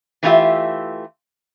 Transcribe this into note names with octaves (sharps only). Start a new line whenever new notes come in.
E3 A3 D#4 F4 G4 E5